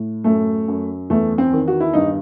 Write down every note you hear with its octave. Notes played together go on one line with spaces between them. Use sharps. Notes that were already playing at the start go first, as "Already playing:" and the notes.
Already playing: A2
F#2 A3
F#2
E2 A3
C4
D#3
F#4
E4
G2 D#4